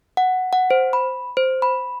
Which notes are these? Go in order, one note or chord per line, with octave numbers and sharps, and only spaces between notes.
F#5
F#5
C5
B5
C5
B5